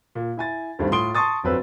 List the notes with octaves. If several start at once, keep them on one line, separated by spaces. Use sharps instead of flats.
A#2
E4 G#5 A6
D2 G2 D3 D#3 G3 C4
A2 F4 C6 D#6 D7 G7
A5 C6 C#6 D#6 A6
G1 F2 F#3 C4 B4 E6